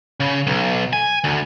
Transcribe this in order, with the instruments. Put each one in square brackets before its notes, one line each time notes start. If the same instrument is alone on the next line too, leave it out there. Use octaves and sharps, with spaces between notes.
[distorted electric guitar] C#3
B1
G#5
D2